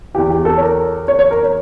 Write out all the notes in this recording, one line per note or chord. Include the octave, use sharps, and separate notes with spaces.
E2 E3 G4
G4
A4
C#5
A#4
C#5
C#5
A#4
C#5